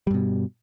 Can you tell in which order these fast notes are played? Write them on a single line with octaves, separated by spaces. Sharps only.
G3 G2 B2